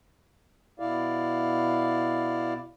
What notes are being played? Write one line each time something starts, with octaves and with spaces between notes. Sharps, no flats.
B2 E4 D5 F5